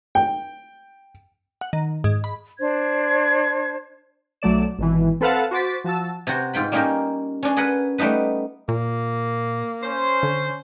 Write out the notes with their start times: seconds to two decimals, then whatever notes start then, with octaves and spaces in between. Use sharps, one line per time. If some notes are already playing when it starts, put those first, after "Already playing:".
0.15 G5
1.61 F#5
1.73 D#3
2.04 G#2
2.24 B5
2.59 D4 C5 G#6
4.42 B1 F#3 A3 D5 E7
4.79 G#1 B2 E3
5.21 C4 A4 B4 F5 F#5 A5
5.51 F#4 C5 D6 A6 B6
5.84 F3 F#4 A5 E6
6.27 C3 F#4 C5
6.54 G#2 F4 G5 B5
6.72 G3 A#3 C#4 D#4 G4 A#4
7.43 C#4 D4 C6
7.57 G#4 A#4 B4 F#5
7.98 G3 A3 B3 D#4 B4
8.69 A#2 A#3
9.83 C#4 C5
10.23 D3